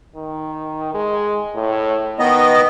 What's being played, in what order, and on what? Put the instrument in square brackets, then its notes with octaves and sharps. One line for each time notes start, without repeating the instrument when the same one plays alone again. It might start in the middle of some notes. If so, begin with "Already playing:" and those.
[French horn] D#3
G#3
A2
[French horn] D#3 [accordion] B3 D#5